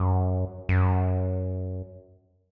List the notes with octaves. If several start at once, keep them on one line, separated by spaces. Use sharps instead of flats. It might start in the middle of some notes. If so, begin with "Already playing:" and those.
Already playing: F#2
F#2